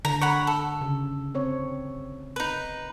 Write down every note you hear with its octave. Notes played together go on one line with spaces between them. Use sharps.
D3 A#5
C#5 F#5 B5
A4
C#3
C4 C#5
D#4 B4